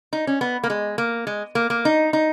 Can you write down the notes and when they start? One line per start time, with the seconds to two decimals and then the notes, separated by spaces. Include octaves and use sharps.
0.13 D#4
0.27 C#4
0.41 B3
0.64 A#3
0.70 G#3
0.98 A#3
1.27 G#3
1.55 A#3
1.70 A#3
1.85 D#4
2.13 D#4